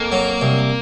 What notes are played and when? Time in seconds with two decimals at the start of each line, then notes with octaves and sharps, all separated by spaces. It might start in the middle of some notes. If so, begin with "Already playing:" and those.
Already playing: F2 A#3
0.12 F#3
0.42 C2